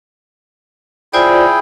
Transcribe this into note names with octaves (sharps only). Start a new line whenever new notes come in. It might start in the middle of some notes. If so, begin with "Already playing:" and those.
E4 F4 G#4 C5 D5 G5